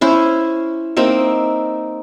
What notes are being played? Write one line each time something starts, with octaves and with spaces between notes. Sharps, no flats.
C#4 E4 C5
A#3 C4 D#4 E5